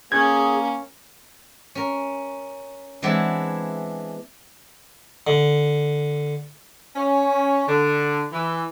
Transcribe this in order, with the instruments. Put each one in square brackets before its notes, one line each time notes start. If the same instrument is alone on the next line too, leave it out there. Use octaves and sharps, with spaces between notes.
[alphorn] A#3 [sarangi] C#4 [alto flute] G#4 [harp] G#6
[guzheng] C#4 A#4
E3 G#3 B3 C4 D4 E4
[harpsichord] D3
[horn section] C#4
D3
E3